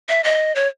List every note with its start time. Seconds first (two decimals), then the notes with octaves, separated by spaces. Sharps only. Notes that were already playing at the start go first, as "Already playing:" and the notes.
0.09 E5
0.24 D#5
0.55 C#5